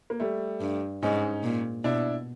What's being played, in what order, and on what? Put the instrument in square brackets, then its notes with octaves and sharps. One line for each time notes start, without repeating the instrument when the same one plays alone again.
[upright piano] A#3
G3 A3
[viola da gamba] G2
[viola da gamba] G#2 [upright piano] C#4 D#4
[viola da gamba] A#2
[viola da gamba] B2 [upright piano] D4 E4